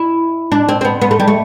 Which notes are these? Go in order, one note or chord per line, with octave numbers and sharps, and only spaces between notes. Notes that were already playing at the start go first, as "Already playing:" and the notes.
Already playing: E4
D4
C4
C4
B3
B3
A3
G3
A3